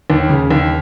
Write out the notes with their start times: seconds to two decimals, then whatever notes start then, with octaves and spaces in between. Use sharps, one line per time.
0.10 D#2
0.30 C#3
0.51 D#2